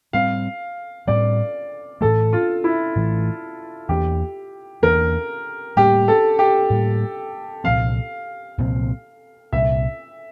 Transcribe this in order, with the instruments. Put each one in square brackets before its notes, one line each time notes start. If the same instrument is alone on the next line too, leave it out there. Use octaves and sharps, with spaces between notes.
[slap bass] A2 G3 C4 [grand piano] F5
[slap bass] A2 G3 C4 [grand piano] D5
[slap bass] A2 E3 A3 [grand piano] A4
[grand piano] F4
E4
[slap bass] A2 E3 A3
[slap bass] E2 E3 A#3 D4 [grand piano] G4
[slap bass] E2 E3 A#3 D4 [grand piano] A#4
[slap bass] A2 G3 A#3 [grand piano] G4
[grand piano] A4
G4
[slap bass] A2 G3 A#3
[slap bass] C2 A#2 F3 C4 [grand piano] F5
[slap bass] C2 A#2 F3 C4
[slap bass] C2 A#2 G3 [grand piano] E5